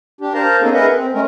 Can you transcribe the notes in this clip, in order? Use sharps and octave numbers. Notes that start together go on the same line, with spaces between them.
D4 G4
A#4 C5 F5 A5 A#5
A#3 B3 C#4 D#4 G#4 A4
G#4 A#4 B4 D#5 E5 F#5
C4
G#3 A3 C#4 A#4